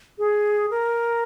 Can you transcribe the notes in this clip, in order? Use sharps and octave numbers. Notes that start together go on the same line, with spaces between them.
G#4
A#4